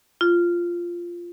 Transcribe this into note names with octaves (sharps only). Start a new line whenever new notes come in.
F4